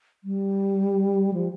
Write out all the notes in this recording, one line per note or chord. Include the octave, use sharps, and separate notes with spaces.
G3
F3